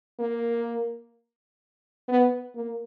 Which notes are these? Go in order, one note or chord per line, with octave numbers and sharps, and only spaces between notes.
A#3
B3
A#3